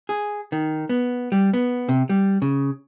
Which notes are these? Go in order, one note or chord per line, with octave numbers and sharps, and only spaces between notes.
G#4
D#3
B3
G3
B3
C3
G3
C#3